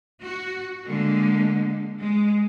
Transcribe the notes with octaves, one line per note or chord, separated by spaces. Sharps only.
F#4
D3 G#3 A#3
G#3